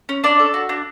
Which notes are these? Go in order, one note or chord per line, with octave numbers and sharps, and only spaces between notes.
C#4
D4 D5
A4
F#4
D4